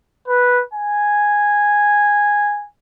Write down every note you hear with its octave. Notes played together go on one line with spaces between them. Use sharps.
B4
G#5